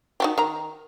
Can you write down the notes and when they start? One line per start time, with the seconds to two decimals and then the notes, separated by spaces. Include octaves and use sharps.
0.20 D#4 F#4 G4
0.38 D#3 A#5